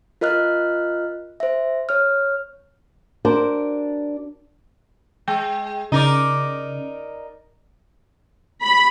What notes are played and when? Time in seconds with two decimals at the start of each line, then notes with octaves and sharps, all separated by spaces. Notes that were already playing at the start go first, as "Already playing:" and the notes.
0.21 F4 A#4 D#5 F6 F#6
1.40 C5 E5
1.89 C#5 F6
3.25 D4 F#4 A#4 C5
5.28 G#3 G5
5.92 C#3 D#4 A#4 D5
8.62 B5